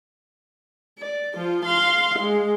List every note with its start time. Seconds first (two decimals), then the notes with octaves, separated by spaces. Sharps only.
0.98 D5
1.35 F3 F4
1.65 F5 C6
2.19 G#3